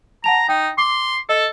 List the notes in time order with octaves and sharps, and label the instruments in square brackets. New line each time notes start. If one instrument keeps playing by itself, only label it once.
[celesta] F#5 A5 F7 [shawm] A#5
[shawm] D#4 [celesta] G5
[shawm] C6 [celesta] D6
[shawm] A4 [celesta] D#5